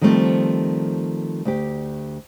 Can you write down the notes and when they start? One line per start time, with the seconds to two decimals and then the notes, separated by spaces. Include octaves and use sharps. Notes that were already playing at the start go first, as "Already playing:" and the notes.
0.01 D#3 F3 G3 A3 C4
1.45 D2 G4